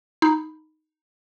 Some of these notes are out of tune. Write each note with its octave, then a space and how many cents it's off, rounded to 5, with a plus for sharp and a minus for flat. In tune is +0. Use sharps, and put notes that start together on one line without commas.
D#4 +0 B5 +0